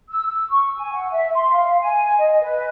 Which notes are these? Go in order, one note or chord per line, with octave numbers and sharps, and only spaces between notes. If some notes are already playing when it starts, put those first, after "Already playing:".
E6
E6
C#6
G#5
F#5
E5
C6
F5
G#5
D#5
B4